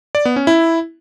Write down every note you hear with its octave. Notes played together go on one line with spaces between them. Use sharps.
D5
B3
C#4
E4